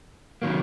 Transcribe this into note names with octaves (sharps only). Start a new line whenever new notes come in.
C3 D#3 F#3 A#3